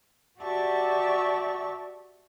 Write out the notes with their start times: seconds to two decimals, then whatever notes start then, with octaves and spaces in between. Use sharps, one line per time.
0.39 F#4 G4 D5 E5 A5 C#6